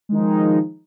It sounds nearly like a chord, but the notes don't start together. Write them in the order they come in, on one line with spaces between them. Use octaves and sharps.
G#3 D#3 D#4 F3